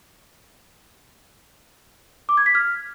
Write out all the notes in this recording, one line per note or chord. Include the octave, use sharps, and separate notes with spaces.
D6
G#6
B6
F6